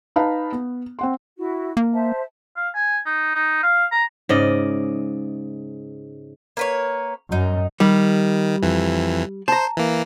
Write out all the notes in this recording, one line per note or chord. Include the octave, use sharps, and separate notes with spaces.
D#4 B4 F5 A5 B5
B3
C4 F#5 C6
E4 F#4
A#3
C5 E5 A5
F5
G#5
D#4
D#4
F5
A#5
G#2 C#3 D5 D#5
A#3 B4 C#5
F#2 D#4
D#3 G3
F2 E3
C5 A5 A#5
E3 A#3